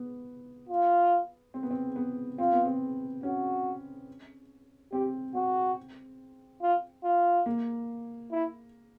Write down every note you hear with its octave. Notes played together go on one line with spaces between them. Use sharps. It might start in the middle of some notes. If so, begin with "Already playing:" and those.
Already playing: B3
F4
C4
B3
C4
B3
C4 F4
B3
C4
C#4 F#4
C4 G4
C4 F#4
F4
F4
A#3
E4